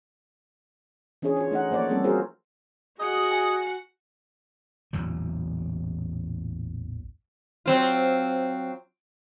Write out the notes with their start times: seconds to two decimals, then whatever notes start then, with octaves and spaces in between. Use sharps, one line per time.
1.22 E3 C#4 D4 G#4 C#5
1.37 F4 C#5
1.51 A3 D#4 D#5 F#5
1.71 F3 A#3 C#5 D5
1.88 G3 A3 A#3 C4 C#4 A4
2.04 F4 F#4 G#4 A#4 C5
3.00 F#4 G#4 D#5 F#5
3.31 G#5
4.93 A1 E2 A#2 F#3
7.66 F#3 C4 F4